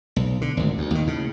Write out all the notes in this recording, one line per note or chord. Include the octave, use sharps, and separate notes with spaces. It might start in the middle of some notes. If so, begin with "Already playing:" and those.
B1
D3
G#1 D2
D2
D#2 D#3
A2 C#3